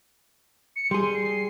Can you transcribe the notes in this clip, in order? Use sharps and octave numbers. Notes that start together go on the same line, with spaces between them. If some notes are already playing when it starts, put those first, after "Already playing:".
C#7
G3 G#4 C6
C7